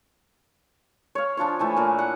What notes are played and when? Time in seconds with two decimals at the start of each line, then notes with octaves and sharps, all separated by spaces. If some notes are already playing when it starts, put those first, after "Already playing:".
1.15 C#5 F5
1.37 F3 D4 F4 C#5
1.59 E3 A3 E4 G#5
1.77 A#2 A#3
1.99 F#5